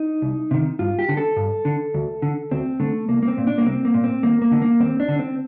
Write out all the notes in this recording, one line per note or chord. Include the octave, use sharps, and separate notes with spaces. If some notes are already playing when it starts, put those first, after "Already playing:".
Already playing: D#4
C2
C3 D#3
G2 F4
G4
D3
A4
G2
D3
D2
D3
D2 C4
D3 A3
C2 A#3
A#3
C4
A#2
D4
A#3
C2 C4
A#3
A#2
C4
D#2 A#3
A#3
D3
A#3
D#2 C4
D4
D3
C4